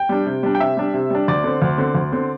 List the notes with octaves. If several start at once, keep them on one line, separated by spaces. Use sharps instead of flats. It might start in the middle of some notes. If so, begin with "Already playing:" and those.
Already playing: G5
G3 D4
C3
G3 D4
G5
C3 E5
G3 D4
C3
G3 D4
D2 D5
D3 C4
D2
D3 C4
D2
D3 C4